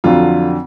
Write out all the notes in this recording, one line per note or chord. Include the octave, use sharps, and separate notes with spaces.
F2 D3 F#3 F4